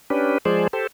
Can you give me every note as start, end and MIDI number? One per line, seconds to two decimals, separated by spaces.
0.10 0.38 61
0.10 0.38 62
0.10 0.38 67
0.10 0.38 71
0.45 0.67 53
0.45 0.67 56
0.45 0.67 68
0.45 0.67 72
0.45 0.67 74
0.73 0.87 67
0.73 0.87 69
0.73 0.87 72